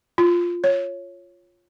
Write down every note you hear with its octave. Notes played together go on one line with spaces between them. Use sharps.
F4
C#5